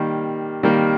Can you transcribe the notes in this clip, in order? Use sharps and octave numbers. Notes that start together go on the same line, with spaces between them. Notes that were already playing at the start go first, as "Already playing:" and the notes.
Already playing: D#3 G3 A#3
D#3 G3 A#3